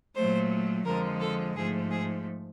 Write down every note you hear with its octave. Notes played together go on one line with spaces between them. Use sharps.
A#2 F#3 A3 C5
F2 D3 F3 G#3 A#4
A4
G#2 F3 A3 G#4
G#4